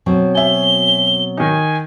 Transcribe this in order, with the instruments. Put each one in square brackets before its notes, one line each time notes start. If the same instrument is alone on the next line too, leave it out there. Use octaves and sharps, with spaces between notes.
[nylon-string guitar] B2 F#3 C4
[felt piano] E5 G#5 [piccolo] G7
[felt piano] D#3 D#4 [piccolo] G#5